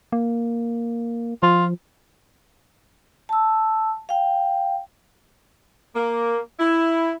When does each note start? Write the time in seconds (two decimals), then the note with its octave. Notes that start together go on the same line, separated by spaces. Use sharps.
0.12 A#3
1.43 F3 F4
3.29 A5 E6
4.09 F5 G5
5.95 A#3
6.59 E4